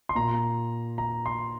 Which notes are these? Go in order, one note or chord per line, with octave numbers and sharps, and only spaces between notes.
C6
A#2 A#5
A#5
C6